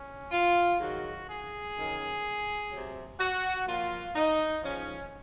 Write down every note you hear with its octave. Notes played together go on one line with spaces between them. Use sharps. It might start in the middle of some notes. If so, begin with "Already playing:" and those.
Already playing: C#4
F4
G#2 D#3 F#3 F#4
G#4
F#2 D#3 F#3
C3 F#3
F#4
A#2 F3 F4
D#4
G#2 F3 C#4